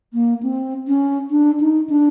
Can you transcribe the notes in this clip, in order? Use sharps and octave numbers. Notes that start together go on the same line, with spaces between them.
A#3
C4
C#4
D4
D#4
D4